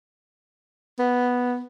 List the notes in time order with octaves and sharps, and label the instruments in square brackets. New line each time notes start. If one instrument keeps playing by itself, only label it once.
[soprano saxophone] B3